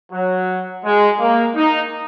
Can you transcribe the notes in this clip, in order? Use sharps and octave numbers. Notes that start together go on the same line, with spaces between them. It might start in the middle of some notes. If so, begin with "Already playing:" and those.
F#3
G#3
A#3
D#4